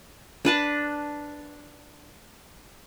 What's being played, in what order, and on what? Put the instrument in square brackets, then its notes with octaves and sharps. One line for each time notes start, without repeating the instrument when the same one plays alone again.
[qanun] D4 B4 A5